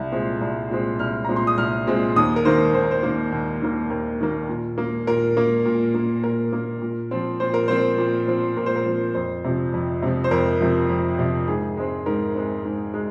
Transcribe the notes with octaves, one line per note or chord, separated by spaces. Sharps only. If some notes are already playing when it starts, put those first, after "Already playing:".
Already playing: C2
A#2 G#3 C4
C2
A#2 G#3 C4
C2 F6
A#2 G#3 C4 A#5
C6
D#6
C2 F6
A#2 G#3 C4
D#2 D#6
A#4
D#3 A#3 C5
D#2 C5
A#4
C5
D#3 A#3
D#2
D#3 A#3
D#2 A#4
D#3 A#3
A#2
A#3
A#2 A#4
A#3
A#2
A#3
A#2 A#4
A#3
A#2
F3 C4
A#2 C5
A#4
F3 C4 C5
A#2
F3 C4
A#2 A#4
C5
A#4
F3 C4
F2 C5
C3 F3
F2
C3 F3
C5
F2 A#4
C3 F3
F2
C3 F3
G#2 G#4
G#3 C4
G#2 A#4
G#3 C4
G#2
G#3